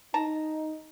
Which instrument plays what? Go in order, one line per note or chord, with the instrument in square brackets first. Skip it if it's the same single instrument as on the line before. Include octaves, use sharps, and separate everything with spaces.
[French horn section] D#4 [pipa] A5 A#5